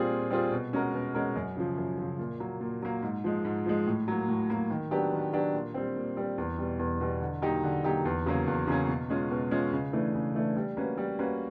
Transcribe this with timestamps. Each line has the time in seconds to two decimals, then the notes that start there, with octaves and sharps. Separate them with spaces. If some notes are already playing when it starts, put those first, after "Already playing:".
Already playing: A#2 G3 C4 F4 G#4
0.10 A#2
0.30 G3 C4 F4 G#4
0.52 B2
0.73 G#3 C#4 F#4 A#4
0.94 B2
1.15 G#3 C#4 F#4 A#4
1.36 F#2
1.57 C#3 F3
1.78 F#2
1.98 C#3 F3
2.19 A#2
2.40 F#3 A#3
2.61 A#2
2.82 F#3 A#3
3.02 G#2
3.24 F3 G#3
3.45 G#2
3.66 F3 G#3
3.87 A2
4.08 F#3 A#3
4.28 A2
4.50 F#3 A#3
4.70 D#3
4.91 F#3 B3 D4 G4
5.13 D#3
5.33 F#3 B3 D4 G4
5.54 A#2
5.74 G3 C4
5.96 A#2
6.17 G3 C4
6.38 E2
6.58 B2 G3
6.79 E2
7.01 B2 G3
7.21 D3
7.42 F#3 A#3 D#4 G4
7.63 D3
7.84 F#3 A#3 D#4 G4
8.05 E2
8.26 C#3 F#3 A#3 C#4
8.47 E2
8.67 C#3 F#3 A#3 C#4
8.89 B2
9.10 G#3 C#4 F4
9.31 B2
9.51 G#3 C#4 F4
9.72 C#3
9.93 E3 A3 D4
10.15 C#3
10.35 E3 A3 D4
10.56 G3
10.77 A#3 C#4 F#4 B4
10.98 G3
11.19 A#3 C#4 F#4 B4